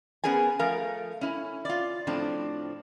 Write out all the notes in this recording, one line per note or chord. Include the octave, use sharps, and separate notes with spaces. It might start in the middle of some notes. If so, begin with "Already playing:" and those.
B3 C#4 G#4 A#4 G#5
F3 A3 A#4 F5
C#4 E4
F4 D5
A2 F3 C4 D4